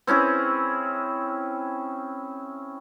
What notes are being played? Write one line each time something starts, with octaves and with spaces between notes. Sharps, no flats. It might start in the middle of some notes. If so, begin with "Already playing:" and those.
C4 C#4 E4 G#4